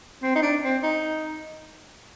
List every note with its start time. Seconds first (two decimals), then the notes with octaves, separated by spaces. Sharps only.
0.22 C4
0.35 D#4
0.42 D4
0.63 C4
0.83 D#4